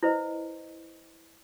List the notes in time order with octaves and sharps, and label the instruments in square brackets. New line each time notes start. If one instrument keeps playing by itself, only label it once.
[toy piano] E4 B4 C5 D#5